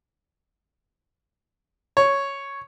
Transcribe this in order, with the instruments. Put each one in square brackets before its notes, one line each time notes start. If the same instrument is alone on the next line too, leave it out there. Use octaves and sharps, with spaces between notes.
[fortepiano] C#5